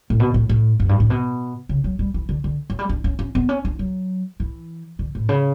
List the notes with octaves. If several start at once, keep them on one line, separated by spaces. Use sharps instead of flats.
A2
B2
A2
A2
F#2
G2
A2
B2
C#3
F#3
G3
E3
D3
D3
F#3
G3
D4
C#4
C#4
B3
C#4
D4
F#3
E3
D3
A2
C#3